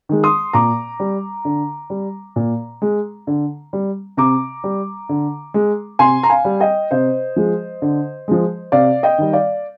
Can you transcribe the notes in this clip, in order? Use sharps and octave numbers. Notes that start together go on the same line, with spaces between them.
D#3 G#3
C6 D#6
A#2 A#5 D6
G3
D3
G3
A#2
G#3
D3
G3
C3 A#5 D6
G3
D3
G#3
C3 G#5 C6
A#5
F5 G#5
G3
D#5 G5
C3 C5 D#5
F3 G#3
D3
F3 G#3
C3 D5 F5
D#5 G5
D#3 G3
D5 F5